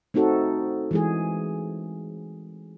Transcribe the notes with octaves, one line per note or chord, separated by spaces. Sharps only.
A3 C4 D#4 F#4 A4
E3 G#3 G#4